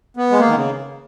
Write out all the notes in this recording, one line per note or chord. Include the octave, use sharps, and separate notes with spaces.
B3
G#3
A#3
D#3
C#3